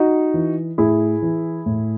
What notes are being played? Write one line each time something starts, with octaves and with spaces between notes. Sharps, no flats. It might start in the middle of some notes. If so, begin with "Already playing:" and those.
Already playing: D#4 F#4
E3
A2 E4 G#4
E3
A2